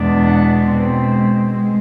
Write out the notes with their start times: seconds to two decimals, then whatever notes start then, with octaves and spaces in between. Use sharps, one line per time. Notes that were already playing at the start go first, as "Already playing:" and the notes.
Already playing: E2 B2 G#3 B3 D4
0.25 F#5
0.67 B2 G#3 C4
1.50 G#3